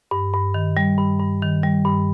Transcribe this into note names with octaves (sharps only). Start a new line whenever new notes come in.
G2
G2
D#3
G3
G2
G2
D#3
G3
G2